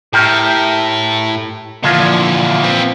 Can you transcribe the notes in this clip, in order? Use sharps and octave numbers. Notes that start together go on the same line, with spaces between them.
A2 G4 A#4
A#2 D3 E3 F3
C4 B4